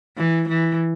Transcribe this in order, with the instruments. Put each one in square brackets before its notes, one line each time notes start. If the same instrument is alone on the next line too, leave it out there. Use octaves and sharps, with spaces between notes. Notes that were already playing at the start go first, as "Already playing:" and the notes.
[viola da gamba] E3
E3